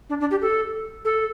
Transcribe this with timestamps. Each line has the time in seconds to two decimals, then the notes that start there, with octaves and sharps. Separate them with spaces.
0.10 D4
0.20 D4
0.31 G4
0.41 A4
1.05 A4